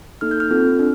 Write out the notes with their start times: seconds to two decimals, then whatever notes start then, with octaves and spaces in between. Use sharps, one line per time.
0.21 A#3 D#4 A4 F6
0.31 G6
0.40 F6
0.51 C4 F4 A4
0.79 D4